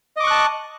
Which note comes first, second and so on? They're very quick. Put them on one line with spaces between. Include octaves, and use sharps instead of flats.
D#5 D6 C#6 F#6 A5